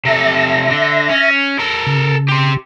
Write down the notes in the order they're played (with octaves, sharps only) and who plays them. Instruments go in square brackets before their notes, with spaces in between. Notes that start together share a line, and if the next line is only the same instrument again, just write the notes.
[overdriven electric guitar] C3 A4 [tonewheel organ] E5 A#6
[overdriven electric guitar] D3
C#4
A4 A#4
[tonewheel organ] C#3
[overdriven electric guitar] G4 C6